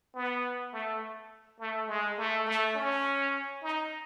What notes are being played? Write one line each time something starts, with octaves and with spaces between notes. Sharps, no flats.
B3
A3
A3
G#3
A3
A3
C#4
D#4